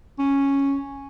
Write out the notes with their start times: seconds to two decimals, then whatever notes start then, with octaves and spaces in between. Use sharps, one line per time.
0.19 C#4